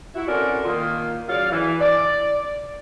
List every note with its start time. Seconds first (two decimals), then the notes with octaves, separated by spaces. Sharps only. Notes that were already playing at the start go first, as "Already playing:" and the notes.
0.15 E4 F#4
0.28 C4 C#4 F#4 A4 A#4 D5
0.66 D#3 A#3 F4
1.29 C#3 F#3 D5 F5
1.52 E3
1.81 D5